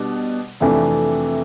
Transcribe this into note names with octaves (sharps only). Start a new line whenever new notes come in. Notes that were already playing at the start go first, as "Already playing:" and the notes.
Already playing: B2 G3 D4
F2 C3 E3 A3 D4